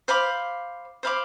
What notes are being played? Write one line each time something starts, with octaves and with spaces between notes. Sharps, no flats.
C5 F5 B5 D6
C5 F5 B5 D6